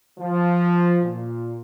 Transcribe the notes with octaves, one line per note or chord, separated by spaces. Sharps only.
F3
A#2